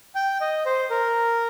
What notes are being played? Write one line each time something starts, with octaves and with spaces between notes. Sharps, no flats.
G5
D#5
C5
A#4